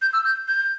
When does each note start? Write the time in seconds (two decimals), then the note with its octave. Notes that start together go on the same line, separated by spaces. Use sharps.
0.02 G6
0.13 E6
0.25 G6
0.48 G6